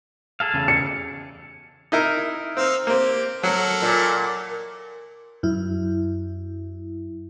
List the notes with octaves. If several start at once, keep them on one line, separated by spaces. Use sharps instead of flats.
G#4 A4 F5
E2 C#3
C#7
D#4 E4 A#4
C4 D#4 F5 E6
A#3 C4 G4
F#3 A4 A#4 F#5
A#2
F#2 E4